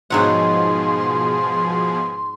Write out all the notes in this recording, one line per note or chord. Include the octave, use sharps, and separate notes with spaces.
G#2 B2 F3 F#3 G#4 F#5 C6